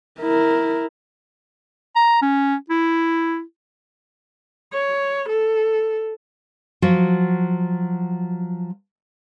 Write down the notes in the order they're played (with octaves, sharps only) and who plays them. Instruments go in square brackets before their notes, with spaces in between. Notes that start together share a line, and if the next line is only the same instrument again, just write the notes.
[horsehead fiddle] E4 A#4
[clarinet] A#5
C#4
E4
[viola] C#5
A4
[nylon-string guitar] F3 F#3 F#4